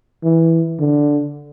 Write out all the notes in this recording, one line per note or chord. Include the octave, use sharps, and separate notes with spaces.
E3
D3